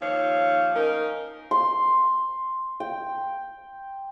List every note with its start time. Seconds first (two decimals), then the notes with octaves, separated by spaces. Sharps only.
0.01 D#2 F3 C#5 F5
0.75 C#4 D#4 A#4
1.51 C6
2.80 G5